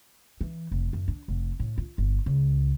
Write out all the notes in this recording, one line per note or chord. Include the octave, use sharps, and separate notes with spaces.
E3
F1
F#2
D4
F1
A2
F4
G1
C#2